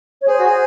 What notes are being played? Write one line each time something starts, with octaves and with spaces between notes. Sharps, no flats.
C#5
G#4 C5
F#4
G#4